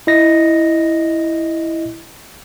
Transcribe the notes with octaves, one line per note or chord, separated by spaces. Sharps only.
E4 D#5 A#6